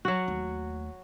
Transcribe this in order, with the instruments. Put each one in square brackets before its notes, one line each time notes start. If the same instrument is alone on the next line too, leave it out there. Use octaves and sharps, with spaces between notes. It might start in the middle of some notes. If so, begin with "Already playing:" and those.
[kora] F#3 F#4
[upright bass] D#2 A3